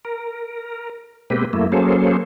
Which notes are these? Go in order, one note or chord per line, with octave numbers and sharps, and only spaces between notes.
A#4
B2 G#3 A#3 C4 G4 B4
F#2 A3 A#3 E4
F#3 A#3 C#4 G#4 A4 C5